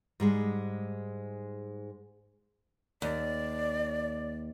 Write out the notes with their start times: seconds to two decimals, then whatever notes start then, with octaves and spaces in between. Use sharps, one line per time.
0.20 G#2 G3 G#3
3.02 D#2 D5